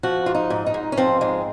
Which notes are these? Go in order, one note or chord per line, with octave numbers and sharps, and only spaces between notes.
F3 F#4
G#2 F4
D#4
G#2
D#4
G#2
C#4
F3 C4
G#2 G#3